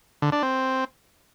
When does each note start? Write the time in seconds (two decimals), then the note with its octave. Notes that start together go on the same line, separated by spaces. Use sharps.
0.22 D3
0.32 D4
0.43 C4